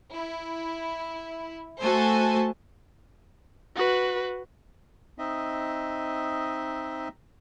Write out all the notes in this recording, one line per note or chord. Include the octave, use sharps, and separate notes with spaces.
E4
A3 F#4 A4 C5 G#5 A5
F#4 B4
C4 D#4 D#5 E5